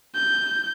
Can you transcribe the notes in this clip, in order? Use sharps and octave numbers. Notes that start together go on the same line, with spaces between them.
G6